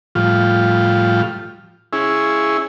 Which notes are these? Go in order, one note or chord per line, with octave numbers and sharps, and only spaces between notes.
A2 F3 G3 F4
C#4 E4 G#4